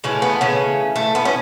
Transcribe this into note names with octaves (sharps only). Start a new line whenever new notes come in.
A2 C#3 E3 A3 C#4
B3
C#3 C#4
A3
B3
C#4